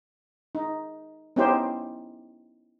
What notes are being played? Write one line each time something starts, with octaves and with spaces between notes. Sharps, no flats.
D#4
B3 C#4 D#4 E4 G4 C5